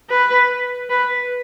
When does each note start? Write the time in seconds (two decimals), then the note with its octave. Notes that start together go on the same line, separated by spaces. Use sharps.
0.10 B4
0.90 B4